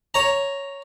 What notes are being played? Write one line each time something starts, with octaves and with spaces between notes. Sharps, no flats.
C#5 A#5